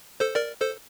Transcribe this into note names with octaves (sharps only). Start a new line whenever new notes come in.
A4 C5
A#4 D5
A4 C5